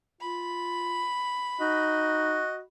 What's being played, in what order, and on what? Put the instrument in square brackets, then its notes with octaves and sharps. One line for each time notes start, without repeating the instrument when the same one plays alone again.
[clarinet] F4 [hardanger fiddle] B5
[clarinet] D#4 [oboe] F#4 [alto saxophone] D#5